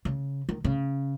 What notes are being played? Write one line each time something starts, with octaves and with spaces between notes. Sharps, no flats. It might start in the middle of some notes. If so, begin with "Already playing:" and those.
C#3
D#3
C#3